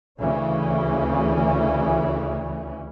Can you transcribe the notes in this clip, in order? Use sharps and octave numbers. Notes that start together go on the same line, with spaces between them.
D2 C#3 E3 C#4